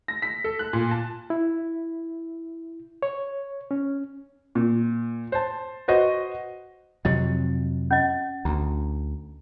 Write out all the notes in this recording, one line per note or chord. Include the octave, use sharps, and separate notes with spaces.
A#6
B6
A4
F#6
A#2
A5
E4
C#5
C#4
A#2
C5 A5
F#4 B4 C5 D#5
F2 C3 F#3 D#5
C#4 D#5
D2 A#5